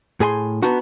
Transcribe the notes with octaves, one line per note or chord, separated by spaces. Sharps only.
A2 G#4 G#5 B5 C6
B3 D4 D#4 F#4